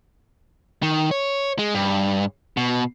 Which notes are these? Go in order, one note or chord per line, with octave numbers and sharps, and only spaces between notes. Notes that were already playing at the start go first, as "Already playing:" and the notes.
D#3
C#5
G#3
G2
B2